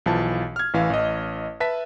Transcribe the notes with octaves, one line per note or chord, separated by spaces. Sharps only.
B1 E3 F3 A5
F6 G#6
A1 E3 F5
A1 D#5
B4 E5 A5 B6